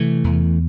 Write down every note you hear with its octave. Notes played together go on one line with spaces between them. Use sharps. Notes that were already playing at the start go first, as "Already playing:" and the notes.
Already playing: C3 E3 A3
E2